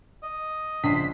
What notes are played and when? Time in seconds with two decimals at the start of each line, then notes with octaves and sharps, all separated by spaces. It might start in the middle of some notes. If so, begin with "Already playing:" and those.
0.23 D#5
0.84 A#1 C#3 D4 C5 B6